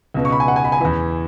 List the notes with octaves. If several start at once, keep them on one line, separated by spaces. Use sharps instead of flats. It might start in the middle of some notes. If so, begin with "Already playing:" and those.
C#2 B2
C#6
B5
G#5
F#5
G#5
B5
G#5
E2 E3 B5